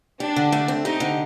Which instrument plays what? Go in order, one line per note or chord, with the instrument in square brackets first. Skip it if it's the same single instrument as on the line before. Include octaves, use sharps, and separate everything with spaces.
[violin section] D4 [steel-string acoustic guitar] G4
[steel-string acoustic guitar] D3
A3
C4
[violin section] D#4 [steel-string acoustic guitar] G4
[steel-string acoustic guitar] D3